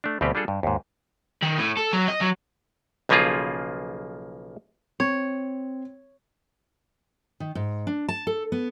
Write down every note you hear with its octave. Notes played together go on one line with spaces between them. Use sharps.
A3 D4
D2 B2 G3 C4 G4 B4
G3 D4 F4 G#4 A4
G2
D#2 G#2
D#3
A2
A4
F#3
D#5
F#3
B1 C#3 F3 A#3 F4 G#4
C4 C#5
D#3
G#2
D4
A5
A4
B3